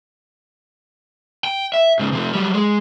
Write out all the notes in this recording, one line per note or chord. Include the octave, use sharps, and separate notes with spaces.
G5
E5
G#2 C#3
C3 F3
F#3 G3
G#3